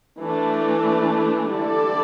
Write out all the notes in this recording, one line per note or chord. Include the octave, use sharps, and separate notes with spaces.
E3 A3 D4
D3 G3 E4 A4 D5